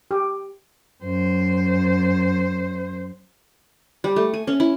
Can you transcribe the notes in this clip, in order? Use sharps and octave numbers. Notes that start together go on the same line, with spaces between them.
G4
F#2 C5
G3
A3
G#5
C#4
E4